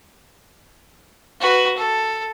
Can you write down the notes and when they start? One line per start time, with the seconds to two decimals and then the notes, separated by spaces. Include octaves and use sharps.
1.41 F#4 B4
1.76 A4